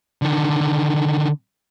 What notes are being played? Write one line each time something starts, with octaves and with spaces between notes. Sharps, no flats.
D3 D#3